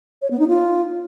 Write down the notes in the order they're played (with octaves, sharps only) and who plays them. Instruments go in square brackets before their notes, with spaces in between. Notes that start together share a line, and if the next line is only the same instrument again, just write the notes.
[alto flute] C#5
B3
D#4
F4